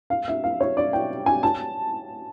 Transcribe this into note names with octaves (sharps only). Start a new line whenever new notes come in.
F5
E5
F5
C#5
D5
G5
G#5
A5